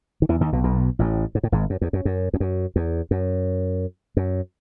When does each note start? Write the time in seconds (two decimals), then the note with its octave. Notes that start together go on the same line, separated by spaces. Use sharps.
0.22 D#3
0.29 E2 E3
0.41 D#2 D#3
0.52 B1 B2
0.64 B1 B2
0.99 A1 A2
1.35 G#2
1.43 A2
1.52 G#1 G#2
1.70 F#2
1.81 E2
1.93 F#2
2.05 F#2
2.33 E2
2.40 F#2
2.76 E2
3.11 F#2
4.17 F#2